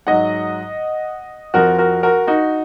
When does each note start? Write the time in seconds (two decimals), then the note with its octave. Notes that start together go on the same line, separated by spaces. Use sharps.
0.07 G#2 F#3 D#5 F#5
1.54 F2 F3 F#4 A#4
1.78 F#4 A#4
2.03 F#4 A#4
2.27 D#4 F#4